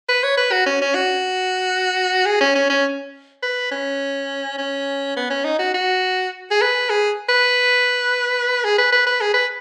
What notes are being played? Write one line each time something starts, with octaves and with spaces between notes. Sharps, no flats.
B4
C#5
B4
F#4
C#4
C#4
F#4
G#4
C#4
C#4
C#4
B4
C#4
C#4
B3
C#4
D#4
F#4
F#4
G#4
B4
G#4
B4
G#4
B4
B4
B4
G#4
B4